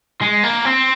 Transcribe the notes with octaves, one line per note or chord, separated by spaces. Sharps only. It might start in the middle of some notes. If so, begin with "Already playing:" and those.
G#3
A#3
C4